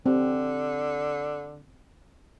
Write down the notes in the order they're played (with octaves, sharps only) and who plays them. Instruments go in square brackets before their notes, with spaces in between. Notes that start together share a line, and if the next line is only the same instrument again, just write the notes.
[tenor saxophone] D3 [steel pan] C4 G4